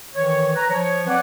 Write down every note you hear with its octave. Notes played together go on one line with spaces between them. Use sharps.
D#3 E3 C#5
B4 A#5
F3 C#5
C4 B4 C#5 D5 F#5